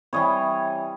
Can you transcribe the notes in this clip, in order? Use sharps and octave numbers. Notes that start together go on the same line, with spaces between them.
C3 E3 G3 C#5 D#5